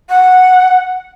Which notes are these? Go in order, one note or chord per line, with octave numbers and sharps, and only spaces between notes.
F#5